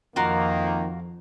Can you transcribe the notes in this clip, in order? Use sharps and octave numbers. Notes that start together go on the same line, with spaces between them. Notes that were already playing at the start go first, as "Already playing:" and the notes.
F2 D#3 A#3 F4 F#4 A#4